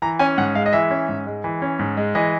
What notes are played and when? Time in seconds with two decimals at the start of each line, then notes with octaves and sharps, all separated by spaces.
0.02 E3 A#5
0.19 C#4 G#5
0.38 G#2 F#5
0.55 G#3 F5
0.66 D#5
0.73 E3 E5
0.90 C#4
1.09 G#2
1.27 G#3
1.44 E3
1.62 C#4
1.79 G#2
1.97 G#3
2.15 E3 D#5